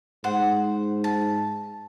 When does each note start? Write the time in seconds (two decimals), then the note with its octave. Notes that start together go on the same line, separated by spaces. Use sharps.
0.24 G#2 C5 F#5
1.04 A5